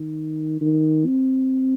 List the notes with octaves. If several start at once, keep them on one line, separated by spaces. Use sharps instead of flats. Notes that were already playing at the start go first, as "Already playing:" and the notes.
Already playing: D#3
D#3
C4